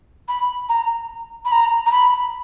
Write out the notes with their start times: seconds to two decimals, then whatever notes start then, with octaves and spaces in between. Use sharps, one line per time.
0.28 B5
0.69 A#5
1.45 B5
1.52 A#5
1.86 A#5
1.92 B5